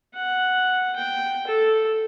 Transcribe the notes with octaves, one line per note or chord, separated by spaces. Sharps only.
F#5
G5
A4